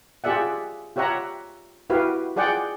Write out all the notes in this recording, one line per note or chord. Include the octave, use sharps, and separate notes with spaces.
F4 G4 G#4 D5 E5 F#5
F4 G4 C#5 E5 F#5 A#5
E4 F#4 G4 B4 F5
F4 G#4 D5 F#5 G5